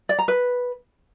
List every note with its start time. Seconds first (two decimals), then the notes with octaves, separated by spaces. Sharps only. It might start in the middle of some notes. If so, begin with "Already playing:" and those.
0.09 D5
0.19 A#5
0.28 B4